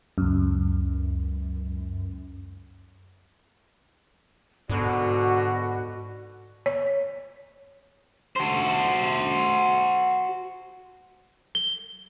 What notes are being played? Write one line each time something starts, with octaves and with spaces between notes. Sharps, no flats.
C#2 F#2
G#2 B2 D3 F#4
C#5
F#4 C5
G7